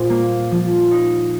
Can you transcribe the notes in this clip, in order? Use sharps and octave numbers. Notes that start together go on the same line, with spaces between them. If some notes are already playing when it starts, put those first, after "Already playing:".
Already playing: A#2 C5
A#3
F3
D#4